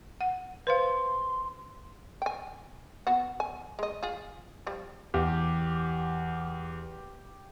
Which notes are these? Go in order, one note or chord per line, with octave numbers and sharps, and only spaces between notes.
F#5
B4 C5 F5 C6
G5 G#5
B3 F#4 F#5
G#5
G#3 D#5
F4 G#4
F3 G3
E2 G4